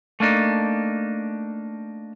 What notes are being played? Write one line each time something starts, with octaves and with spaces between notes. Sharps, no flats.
A3 A#3 D4 D#4